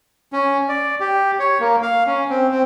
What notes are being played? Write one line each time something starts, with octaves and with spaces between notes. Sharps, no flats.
C#4
D5
G4
C#5
A#3
F5
C#4
C4
C4